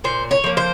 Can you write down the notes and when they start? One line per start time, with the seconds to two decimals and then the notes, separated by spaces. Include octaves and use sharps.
0.04 A#2 C5
0.31 C#5
0.44 F3 A#3
0.57 C5